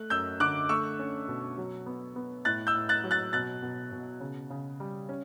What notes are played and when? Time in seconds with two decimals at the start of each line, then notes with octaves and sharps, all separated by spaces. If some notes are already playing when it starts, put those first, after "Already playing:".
Already playing: A3 F#6
0.10 F#2 E6 G6
0.40 D3 D6 F#6
0.69 A3 C#6 E6
0.99 C#4
1.28 B2
1.58 F#3
1.86 B3
2.16 B3
2.45 A2 F#6 A6
2.67 E6 G6
2.74 A2
2.89 F#6 A6
3.04 F#3
3.11 F#6 A6
3.33 B2 F#6 A6
3.62 B2
3.92 B2
4.21 C#3
4.50 C#3
4.80 G3
5.09 C#4